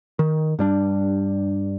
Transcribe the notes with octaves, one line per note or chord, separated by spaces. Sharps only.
D#3
G2 G3 D4